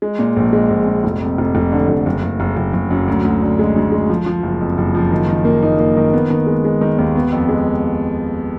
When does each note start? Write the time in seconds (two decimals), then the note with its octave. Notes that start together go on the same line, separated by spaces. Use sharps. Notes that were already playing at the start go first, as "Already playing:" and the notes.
0.02 G#3
0.19 A#2
0.36 A#1
0.53 G#3
0.70 A#1
0.87 A#2
1.04 F1
1.21 F2
1.38 F1
1.55 F1
1.72 D3
1.89 F1
2.06 F#1
2.23 F#1
2.40 F#1
2.56 F#1
2.73 F#1
2.90 F#2
3.08 D2
3.25 D2
3.42 D3
3.59 G#3
3.76 D2
3.92 G#3
4.10 F3
4.26 F3
4.43 F#1
4.61 F2
4.78 F#1
4.95 F3
5.11 D#3
5.29 D#3
5.45 A#3
5.63 D#4
5.79 A#3
5.97 D#3
6.13 B3
6.30 D#3
6.47 G#3
6.65 G#3
6.81 D#3
6.98 D#2
7.15 B3
7.32 F2
7.49 G#3